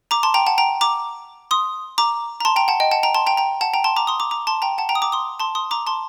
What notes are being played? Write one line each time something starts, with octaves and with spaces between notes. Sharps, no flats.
A#5 D6
A5 C6
G5 A#5
F#5 A5
G5 A#5
A#5 D6
C6 D#6
A#5 D6
A#5
A5 C6
G5 A#5
F#5 A5
D#5 G5
F#5 A5
G5 A#5
A5 C6
G5 A#5
G5 A#5
F#5 A5
G5 A#5
A5 C6
A#5 D6
C6 D#6
A#5 D6
A#5 D6
A5 C6
G5 A#5
F#5 A5
G5 A#5
D#6
A#5 D6
C6 D#6
A5 C6
C6 D#6
A#5 D6
A5 C6